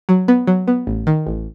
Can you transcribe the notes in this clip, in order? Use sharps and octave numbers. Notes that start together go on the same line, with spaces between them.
F#3
B3
F#3
B3
A1
D#3
A1